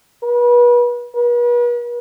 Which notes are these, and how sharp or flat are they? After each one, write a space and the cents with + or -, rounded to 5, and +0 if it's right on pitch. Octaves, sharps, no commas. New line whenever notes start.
B4 -35
B4 -45